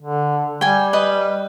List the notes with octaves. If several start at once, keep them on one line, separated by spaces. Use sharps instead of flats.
D3
G3 G5 G#5
B4 D#5